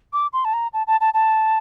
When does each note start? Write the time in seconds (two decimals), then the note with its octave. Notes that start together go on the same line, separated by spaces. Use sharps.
0.13 D6
0.33 C6
0.45 A5
0.53 A#5
0.73 A5
0.87 A5
1.01 A5
1.14 A5